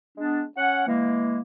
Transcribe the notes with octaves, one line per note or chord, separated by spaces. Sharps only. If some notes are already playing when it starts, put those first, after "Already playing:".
G#3 B3 D4
C#4 F#5
E3 G#3 A#3